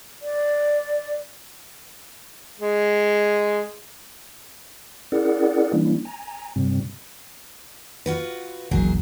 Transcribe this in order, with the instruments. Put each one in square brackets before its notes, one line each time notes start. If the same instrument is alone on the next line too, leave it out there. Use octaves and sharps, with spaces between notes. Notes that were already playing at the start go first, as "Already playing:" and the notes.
[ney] D5
[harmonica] G#3
[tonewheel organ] C#4 E4 G#4 A#4 D5 F#5
E3 G3 A#3 C#4 D4 E4
G#5 A#5
G2 C3 G3 C4
[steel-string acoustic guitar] F4 F#4 B4
[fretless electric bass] E1 A#1 E2 [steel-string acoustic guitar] D#3 F#3 G#4